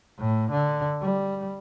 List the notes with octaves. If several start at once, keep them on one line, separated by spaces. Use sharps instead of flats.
A2
D3
G3